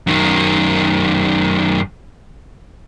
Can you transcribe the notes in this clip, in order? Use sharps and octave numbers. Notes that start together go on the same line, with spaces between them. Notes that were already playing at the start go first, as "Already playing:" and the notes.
F#2 D#3